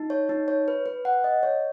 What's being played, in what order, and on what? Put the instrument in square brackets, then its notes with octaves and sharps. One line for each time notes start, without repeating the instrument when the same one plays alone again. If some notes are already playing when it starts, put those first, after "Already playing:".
Already playing: [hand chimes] D#4
C#5
D#4
C#5
B4
B4
F#5
D#5
C#5